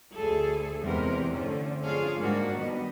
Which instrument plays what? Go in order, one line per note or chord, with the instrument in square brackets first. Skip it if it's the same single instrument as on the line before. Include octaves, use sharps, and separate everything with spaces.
[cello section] D2 G#4 A4
E2 C3 E3 G#3 A#4
D3 A3 C4 C#4
F3 D4 F4 G#4 C#5 F5
G#2 G3 A#3 D4 F#4
D#3 G3 B3 D#5